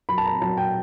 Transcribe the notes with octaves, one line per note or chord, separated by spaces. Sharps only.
F#3 B5
A5
A#5
F#3 A5
G5